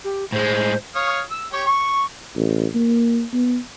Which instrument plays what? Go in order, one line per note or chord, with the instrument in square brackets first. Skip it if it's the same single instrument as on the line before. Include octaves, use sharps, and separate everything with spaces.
[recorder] G4
[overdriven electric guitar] A2 G#3 [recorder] C5
[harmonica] C#5 F5 D#6
E6
G4 C#5 G5
C#6
[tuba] A1
A#3
B3